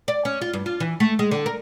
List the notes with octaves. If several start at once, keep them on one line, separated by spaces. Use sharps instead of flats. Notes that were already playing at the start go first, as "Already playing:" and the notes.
D5
C#4
F4
G2
F4
E3
A3
G#3
D3
A#4